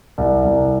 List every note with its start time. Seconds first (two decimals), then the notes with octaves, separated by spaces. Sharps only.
0.18 C2
0.45 C2